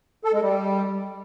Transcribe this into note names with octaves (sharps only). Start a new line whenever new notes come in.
A4
G#3
G3